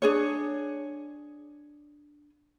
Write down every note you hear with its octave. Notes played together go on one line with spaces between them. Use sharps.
D4 G#4 C#5